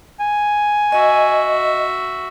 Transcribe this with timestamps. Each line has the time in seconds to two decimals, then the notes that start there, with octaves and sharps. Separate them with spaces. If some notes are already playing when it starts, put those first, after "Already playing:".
0.20 G#5
0.92 F#4 D#5 E5